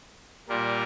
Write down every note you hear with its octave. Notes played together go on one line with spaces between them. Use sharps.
A#2 G3 A#3 F4 A#4